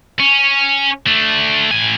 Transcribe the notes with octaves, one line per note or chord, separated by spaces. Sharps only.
C#4
A3 D4
A2 G#5